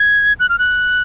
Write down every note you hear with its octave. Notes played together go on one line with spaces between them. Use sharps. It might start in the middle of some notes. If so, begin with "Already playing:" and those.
Already playing: G#6
F#6
F6
F#6